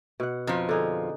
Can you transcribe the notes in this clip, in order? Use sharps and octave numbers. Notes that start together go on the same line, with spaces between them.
B2 F#5
F2 F3 D#4
D3 D#4 G#4